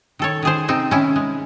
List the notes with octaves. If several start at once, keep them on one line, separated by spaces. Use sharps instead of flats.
D#3 A4 C#5
D#3 G#4 C5
C3 C4 D#4
D#3 C#4 E4
G#3